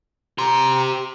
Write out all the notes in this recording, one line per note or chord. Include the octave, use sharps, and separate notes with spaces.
G4 A#5 C6